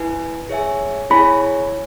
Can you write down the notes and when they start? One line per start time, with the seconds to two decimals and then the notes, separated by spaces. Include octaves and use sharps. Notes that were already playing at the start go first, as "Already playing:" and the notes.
Already playing: E4 B4 G#5
0.49 G#4 C#5 E5 G#5
1.10 E4 G#4 C#5 G#5 B5